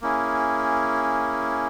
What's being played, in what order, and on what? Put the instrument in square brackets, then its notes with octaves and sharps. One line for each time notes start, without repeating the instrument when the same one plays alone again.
[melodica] A#3 C#4 E4 G#4